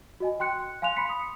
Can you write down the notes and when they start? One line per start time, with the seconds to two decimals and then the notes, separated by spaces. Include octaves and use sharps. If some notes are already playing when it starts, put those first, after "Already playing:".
0.20 F#4 D#5 G#5
0.40 G5 C6 F#6 C#7
0.82 F5 G#5 C6 F#6 F7
0.96 B5 C6 B6 C#7
1.09 D#6